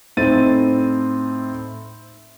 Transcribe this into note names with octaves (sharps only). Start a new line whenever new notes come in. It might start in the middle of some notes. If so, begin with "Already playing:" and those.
A2 C4 D#4 A4 A6 D#7